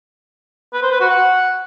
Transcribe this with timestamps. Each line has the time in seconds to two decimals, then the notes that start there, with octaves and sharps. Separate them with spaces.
0.74 B4
0.83 C5
0.92 B4
1.01 F#4
1.09 F#5